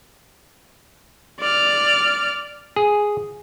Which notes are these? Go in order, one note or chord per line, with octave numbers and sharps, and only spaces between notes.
D5 F6
G#4